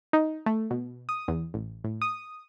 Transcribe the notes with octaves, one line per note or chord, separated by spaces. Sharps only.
D#4
A3
B2
D#6
E2
A1
A2
D#6